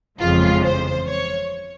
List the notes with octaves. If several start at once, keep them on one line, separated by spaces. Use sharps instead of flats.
G1 F2 C#3 E3 G#3 F4
C5
C#5